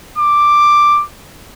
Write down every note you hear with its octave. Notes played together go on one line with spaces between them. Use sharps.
D6